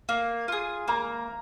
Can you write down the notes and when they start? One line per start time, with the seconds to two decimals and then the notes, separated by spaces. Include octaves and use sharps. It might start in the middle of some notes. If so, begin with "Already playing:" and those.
0.09 A#3 F5
0.48 F4 G#4
0.88 A#3 A#5